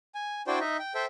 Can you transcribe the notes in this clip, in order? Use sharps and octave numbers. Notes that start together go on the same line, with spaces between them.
G#5
D4 E4 F#4 C5 D5 G5
D#4 D#5 E5
G5
A4 C5 E5 G5